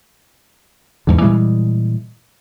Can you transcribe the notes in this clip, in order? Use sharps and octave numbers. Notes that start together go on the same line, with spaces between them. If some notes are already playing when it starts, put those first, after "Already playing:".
E2 G#2 D3
A#2 E3 G3 G#3